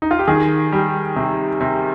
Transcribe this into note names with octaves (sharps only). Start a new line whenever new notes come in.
D#4
F4
G4
D#3 G#4
G3
C3
C3